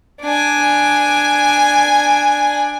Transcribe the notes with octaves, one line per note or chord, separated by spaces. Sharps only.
D4 G#5